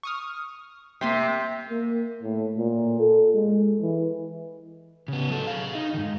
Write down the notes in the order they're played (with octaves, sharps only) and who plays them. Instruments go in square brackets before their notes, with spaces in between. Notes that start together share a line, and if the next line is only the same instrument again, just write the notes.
[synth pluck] C#6 D#6 F6
[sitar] C3 [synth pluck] A#3 C6 B6
[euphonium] A#3
A2
A#2
A4
G#3
E3
[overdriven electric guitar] C#3 B3
F#3 A4
G#4 F5
D#4
G#2 D#3